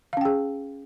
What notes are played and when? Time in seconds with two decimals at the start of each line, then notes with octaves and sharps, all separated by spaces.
0.13 F5
0.17 C#4
0.21 G5
0.25 G#4